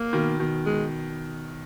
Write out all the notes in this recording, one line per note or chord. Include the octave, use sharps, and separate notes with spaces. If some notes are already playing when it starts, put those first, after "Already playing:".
Already playing: A#3
B2 D#3
B2 D#3
G#3